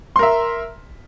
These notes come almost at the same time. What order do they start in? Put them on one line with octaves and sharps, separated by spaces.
C6 A#4 E5